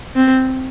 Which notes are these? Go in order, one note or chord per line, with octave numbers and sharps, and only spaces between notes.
C4